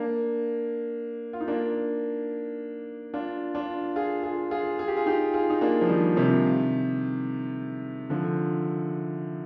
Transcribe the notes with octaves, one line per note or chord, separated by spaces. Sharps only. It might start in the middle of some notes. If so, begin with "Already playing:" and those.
Already playing: A#3 D4
F4
D#4
A#3 D4
D4 F4
D4 F4
F4 G#4
F4 G#4
F4 G#4
G#4
G4
F4 G#4
D#4 G4
F4 G#4
D#4
A#3 D4
F3
D#3 G3
C3 D#3
D3 F3